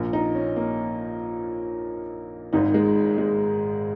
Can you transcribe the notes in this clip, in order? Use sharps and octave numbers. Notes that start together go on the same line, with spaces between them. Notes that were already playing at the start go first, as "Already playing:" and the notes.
Already playing: A#1 A#2
D#4
C#4
A#3
G#1 G#2 D#3 D#4
G#3
G#3